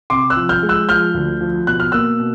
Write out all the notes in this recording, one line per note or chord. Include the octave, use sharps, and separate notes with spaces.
C3 C6 D6
E6 F#6
F3
F6 G6
G#3
E6 F#6
F3 F6 G6
D2
F3
B2 F#6
F6
A#3 E6 F#6
B2